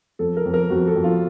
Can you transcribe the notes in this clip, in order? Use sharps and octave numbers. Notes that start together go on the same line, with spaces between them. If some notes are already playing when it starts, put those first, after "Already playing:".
F2 A4
A#4
F2
A#4
F2 F#4
A4
F2
F4